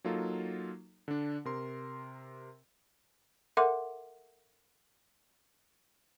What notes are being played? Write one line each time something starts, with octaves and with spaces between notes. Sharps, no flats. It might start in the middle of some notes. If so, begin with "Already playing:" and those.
F#3 A#3 D#4 F4 A4
D3 D4
C3 A#4 C6
A4 A#4 E5 F#5 C6 D6